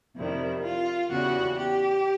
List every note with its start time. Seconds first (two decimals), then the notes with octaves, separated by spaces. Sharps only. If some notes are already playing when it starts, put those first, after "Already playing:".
0.16 F2 C3 D#3 G3 E4
0.63 F4
1.11 E2 C#3 E3 G3 F#4
1.57 G4